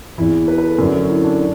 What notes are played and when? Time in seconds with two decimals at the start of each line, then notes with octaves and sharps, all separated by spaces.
0.18 E2 E3 E4
0.48 B4
0.58 B4
0.69 A4
0.78 F#2 D3 F#3
1.09 E4
1.24 D4
1.39 D4